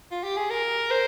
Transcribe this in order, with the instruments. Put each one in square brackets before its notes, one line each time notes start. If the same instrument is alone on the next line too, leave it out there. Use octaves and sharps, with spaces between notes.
[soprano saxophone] F4
G4
G#4
A#4
C5